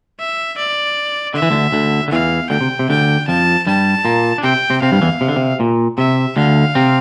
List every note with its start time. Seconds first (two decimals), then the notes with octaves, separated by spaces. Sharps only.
0.19 E5
0.58 D5
1.34 D3 E5
1.42 E3
1.51 D2 D3
1.72 D2 D3
2.08 D3
2.12 E2 E3 F5
2.50 D2 D3 G5
2.61 C3
2.79 C3
2.89 D2 D3 G5
3.28 F2 F3 A5
3.67 G2 G3 A5
4.05 A#2 A#3
4.38 D4
4.43 C3 C4 G5
4.70 C3 C4
4.82 C3 C4 F5
4.92 G2 G3
5.02 E2 E3
5.21 C3
5.28 D3
5.36 C3
5.60 A#2
5.98 C3 E5
6.37 D2 D3 F5
6.75 C3 C4